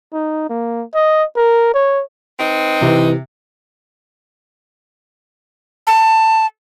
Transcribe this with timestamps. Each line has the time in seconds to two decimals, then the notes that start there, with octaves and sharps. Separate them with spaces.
0.13 D#4
0.50 A#3
0.94 D#5
1.36 A#4
1.74 C#5
2.39 C4 D#4 B4
2.81 C3 E3
5.87 A5